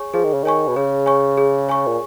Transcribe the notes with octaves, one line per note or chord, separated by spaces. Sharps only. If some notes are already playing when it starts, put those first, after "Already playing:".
Already playing: G#4 C#5 G#5 C#6
F3 G#4
D#3
C#3
D#3 C#5 G#5 C#6
B2
C#3 G#4
C#5 G#5 C#6
G#4
C#5 G#5 C#6
A#2